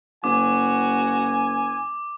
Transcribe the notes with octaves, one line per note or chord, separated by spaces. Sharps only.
F#1 F#4 G#5 D6